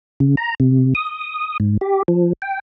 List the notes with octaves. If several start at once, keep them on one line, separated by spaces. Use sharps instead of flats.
C#3
A#5
C3
D#6
G#2
G4
F3
G5